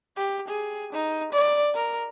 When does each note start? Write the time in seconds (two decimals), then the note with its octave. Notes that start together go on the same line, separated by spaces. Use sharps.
0.17 G4
0.48 G#4
0.93 D#4
1.33 D5
1.75 A#4